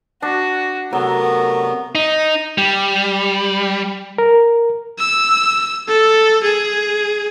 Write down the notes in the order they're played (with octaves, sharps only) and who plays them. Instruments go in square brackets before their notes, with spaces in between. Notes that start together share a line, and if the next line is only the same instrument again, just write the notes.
[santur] D4 [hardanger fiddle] F#4
[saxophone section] C3 A3 B3 [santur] F#3 [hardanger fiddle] A#4
[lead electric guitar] D#4
G3
[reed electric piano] A#4
[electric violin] E6
A4
G#4